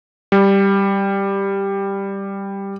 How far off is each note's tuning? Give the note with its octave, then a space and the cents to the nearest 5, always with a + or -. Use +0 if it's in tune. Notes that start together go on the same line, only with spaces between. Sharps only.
G3 +5